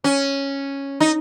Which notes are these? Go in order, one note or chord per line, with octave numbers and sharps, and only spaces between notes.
C#4
D#4